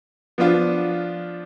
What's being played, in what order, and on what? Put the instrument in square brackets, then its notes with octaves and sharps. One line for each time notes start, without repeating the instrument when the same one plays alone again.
[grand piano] F3 B3 D4 F4